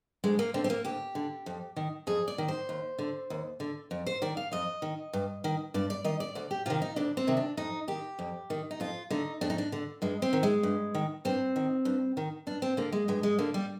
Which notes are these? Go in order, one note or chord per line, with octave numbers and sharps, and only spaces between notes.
D2 G#3
A#3
D3 C4
C4
A#3
D2 G4
D3
F2
D#3
F2 G#4
D5
D#3
C5
D#2
D3
D#2
D3
F2
C5
D#3 D5
F5
F2 D#5
D#3
G2
D#3
G2 D5
D5
D#3 D#5
D5
D2 D5
G4
C3 D#3 F4
D#4
D2 D4
C4
C3 D#3
D4
F2 D#4
D#3 G4
F2
D#3
D#4
F2 F4
D3 D#4
F2 D4
D#4
D4
D3
G2 G#3
C4
D#3
G#3
G2
D#3
G2 C4
D#3
G2
D#3
G2 D4
C4
D3 A#3
G#3
G2 G#3
G#3
D3 A#3
G3